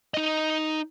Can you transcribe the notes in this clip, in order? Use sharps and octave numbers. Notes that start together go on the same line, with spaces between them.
D#4 D#5